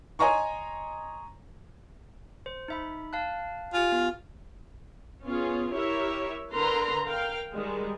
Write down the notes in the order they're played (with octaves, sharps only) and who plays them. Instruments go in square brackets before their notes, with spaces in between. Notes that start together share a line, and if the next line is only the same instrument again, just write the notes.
[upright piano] C#5 D#5 G#5 A#5 C6 C#6
[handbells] C5
D#4 E5 B5
F5 A5 F#6
[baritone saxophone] F4 [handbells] G4 G#5
[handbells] B3
[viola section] B3 C#4 F4 G#4
E4 G4 A#4 C#5 E5
D3 A#4 B4 A#5 C6
A#4 F5 G5
D#3 G3 G#3